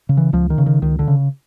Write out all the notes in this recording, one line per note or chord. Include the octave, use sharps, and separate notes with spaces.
C#3
E3
C#2 F3
D#3
C#3
D#3
C#2 D#3
D3
C#3